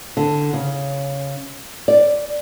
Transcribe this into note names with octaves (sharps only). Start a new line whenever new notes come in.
D3
C#3
D5